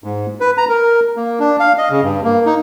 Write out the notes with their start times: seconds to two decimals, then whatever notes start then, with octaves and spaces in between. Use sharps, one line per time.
0.04 G#2
0.40 B4
0.58 A#5
0.69 A#4
1.16 A#3
1.40 D4
1.60 F5
1.78 D#5
1.90 C#3
2.03 G2
2.24 A#3
2.46 D#4